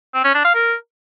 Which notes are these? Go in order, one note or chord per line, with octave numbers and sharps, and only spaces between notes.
C4
C#4
D4
F5
A#4